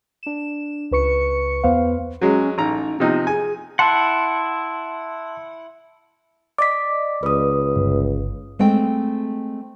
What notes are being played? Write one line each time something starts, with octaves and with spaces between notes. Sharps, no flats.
D4 E7
C#2 B4 C#6 C#7
E2 B3 B4 C5 F5
F#3 G#3 C#4
A1 D#4 A#5
C3 F3 B3 D#4
G#4 G#5
E4 F#5 A5 C6
D5 D#5 D6 B6
C#2 B4 D#6
G1
G#3 A3 C4 G5